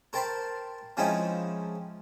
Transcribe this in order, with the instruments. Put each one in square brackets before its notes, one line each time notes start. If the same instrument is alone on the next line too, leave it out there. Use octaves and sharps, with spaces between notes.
[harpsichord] A#4 C5 G5 A5 B5 C6
F3 G#3 C4 C#4 D#4 E4